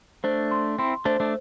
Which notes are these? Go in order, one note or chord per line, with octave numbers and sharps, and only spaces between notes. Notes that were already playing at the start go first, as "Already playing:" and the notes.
A3 D4 C5
C6
C4 E4 C6
A3 D4 C5
A3 D4